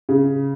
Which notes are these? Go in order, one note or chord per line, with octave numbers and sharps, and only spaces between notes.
C#3